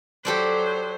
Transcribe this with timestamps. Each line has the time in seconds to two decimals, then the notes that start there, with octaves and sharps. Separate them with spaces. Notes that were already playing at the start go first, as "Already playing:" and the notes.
0.25 F#3 G4 A4 C5 D5